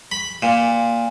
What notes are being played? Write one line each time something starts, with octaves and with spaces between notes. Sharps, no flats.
B5
A#2